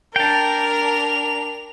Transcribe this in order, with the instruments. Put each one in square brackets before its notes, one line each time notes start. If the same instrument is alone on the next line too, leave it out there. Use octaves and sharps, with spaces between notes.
[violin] D4 F7 [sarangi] A#4 [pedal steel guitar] G5 A5